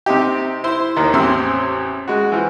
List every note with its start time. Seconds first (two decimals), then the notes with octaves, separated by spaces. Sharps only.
0.06 C3 C4 D#4 G4
0.64 E4 C5
0.96 D#2 D#3
1.13 A1 E2 C4 C5 E6
2.08 G#3 F#4
2.32 E3 F3